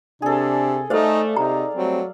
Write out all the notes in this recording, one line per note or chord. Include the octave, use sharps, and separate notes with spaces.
C3 D4 G#4 A4
A3 D#4 A4 C5 D5 F5
C3 D#4 A#5
F#3 G3 A3 C4